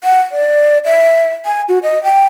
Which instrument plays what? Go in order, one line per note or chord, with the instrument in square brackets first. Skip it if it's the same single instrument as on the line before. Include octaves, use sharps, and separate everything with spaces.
[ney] F#5
D5
E5
G#5
F#4
D#5
G5